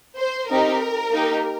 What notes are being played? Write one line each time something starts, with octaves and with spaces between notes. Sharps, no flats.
C5
C4 D#4 G4 A#4
A#3 D#4 G4